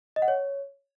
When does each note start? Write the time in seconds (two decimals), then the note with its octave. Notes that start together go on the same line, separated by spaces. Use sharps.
0.16 D#5
0.22 F#5
0.28 C#5